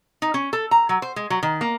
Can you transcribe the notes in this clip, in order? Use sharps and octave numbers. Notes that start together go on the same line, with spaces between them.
D#4
C#4
A4
A#5
F#3
C5
G#3
F#3
D#3
A#3